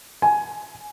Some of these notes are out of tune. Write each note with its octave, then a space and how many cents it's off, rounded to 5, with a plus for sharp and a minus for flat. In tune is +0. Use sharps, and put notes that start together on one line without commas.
G#5 +10